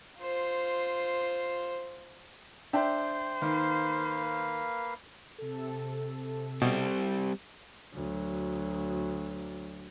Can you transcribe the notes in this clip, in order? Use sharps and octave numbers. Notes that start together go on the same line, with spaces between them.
F4 C5
D4 C5 E5 G5
D#3 A#3 B4 F5
C3 A4
B2 G3 C4
D2 F#3